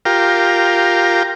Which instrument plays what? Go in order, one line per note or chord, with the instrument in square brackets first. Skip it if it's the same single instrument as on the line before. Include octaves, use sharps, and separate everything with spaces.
[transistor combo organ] F4 G4 A#4